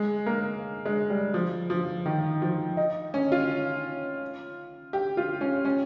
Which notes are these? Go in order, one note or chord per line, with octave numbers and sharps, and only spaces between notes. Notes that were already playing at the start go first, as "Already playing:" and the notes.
Already playing: G#3
A#3
G#3
G3
F3
F3
D#3
F3
D#4
C#4
F4
G4
F4
C#4
C#4